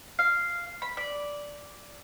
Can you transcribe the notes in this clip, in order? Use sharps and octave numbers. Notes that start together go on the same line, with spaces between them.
F5
B5
D5